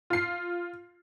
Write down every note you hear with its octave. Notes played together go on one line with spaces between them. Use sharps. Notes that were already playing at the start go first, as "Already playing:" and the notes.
F4 C7